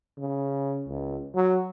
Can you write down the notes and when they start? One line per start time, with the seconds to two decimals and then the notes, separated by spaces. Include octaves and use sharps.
0.19 C#3
0.88 C#2
1.35 F#3